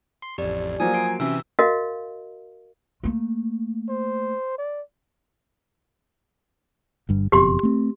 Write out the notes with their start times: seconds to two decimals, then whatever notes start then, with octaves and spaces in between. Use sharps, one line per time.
0.22 C6
0.38 A1 F2 G4 D5
0.80 F3 F#3 A#3 G#5 D#6
0.94 F#4 D7
1.20 C3 E3 C#4 E4 E6
1.59 F#4 A#4 D#5 F5
3.03 A3 A#3
3.89 C5
4.58 D5
7.09 G1 G2
7.32 F#1 F2 B2 G4 C6
7.63 A3 C4